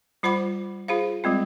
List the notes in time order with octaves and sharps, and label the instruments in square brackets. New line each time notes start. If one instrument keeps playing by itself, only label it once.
[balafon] G3 F4 C5 F#5 B5 D6
F4 G#4 C5 F5
G3 G#3 C4 F4